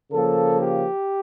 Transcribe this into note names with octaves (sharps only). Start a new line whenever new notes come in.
C#3 F3 A#3 A4
G4